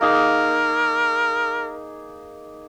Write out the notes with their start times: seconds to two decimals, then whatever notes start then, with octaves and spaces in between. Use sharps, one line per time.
0.01 A#3 D#4 G#4 A#4